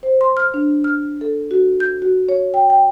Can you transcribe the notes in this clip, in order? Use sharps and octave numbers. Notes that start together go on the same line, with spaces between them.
C5
C6
F6
D4
F6
A4
F#4
G6
F#4
C#5
G5
G5